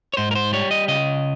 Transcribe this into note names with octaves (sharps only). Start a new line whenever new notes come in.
C#5
G#2 C5
A#4
C5
G3 C#5
D#5
C#3 D#5